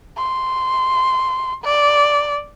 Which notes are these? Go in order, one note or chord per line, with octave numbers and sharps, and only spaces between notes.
C6
D5